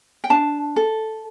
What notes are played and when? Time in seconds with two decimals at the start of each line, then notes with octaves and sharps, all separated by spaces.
0.24 G5
0.30 D4 A5
0.76 A4